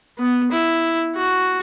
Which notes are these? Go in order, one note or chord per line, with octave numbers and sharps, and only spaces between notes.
B3
E4
F#4